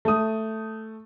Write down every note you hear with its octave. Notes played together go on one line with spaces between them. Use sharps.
A3 D#6